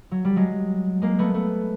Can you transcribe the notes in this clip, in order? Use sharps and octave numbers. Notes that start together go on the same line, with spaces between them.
F#3
G3
F#3 G#3
G#3 A#3
A3 B3
A3 B3